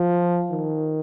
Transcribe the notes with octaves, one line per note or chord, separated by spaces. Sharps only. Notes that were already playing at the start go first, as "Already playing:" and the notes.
Already playing: F3
D#3